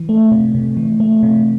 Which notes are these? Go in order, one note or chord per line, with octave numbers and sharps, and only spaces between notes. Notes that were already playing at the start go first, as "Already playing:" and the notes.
Already playing: E3
A3
C3
C3
E3
A3
C3